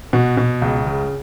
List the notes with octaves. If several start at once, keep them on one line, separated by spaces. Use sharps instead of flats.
B2 F#4
B2
C#2
C#3